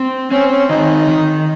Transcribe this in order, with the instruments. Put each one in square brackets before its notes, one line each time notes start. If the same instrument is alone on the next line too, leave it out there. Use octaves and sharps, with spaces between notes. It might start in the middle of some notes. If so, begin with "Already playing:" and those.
Already playing: [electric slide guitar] C4
[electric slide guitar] C4 [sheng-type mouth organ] C#4
[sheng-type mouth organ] C#4
[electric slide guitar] D#3 [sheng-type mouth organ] D#4
[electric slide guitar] D#3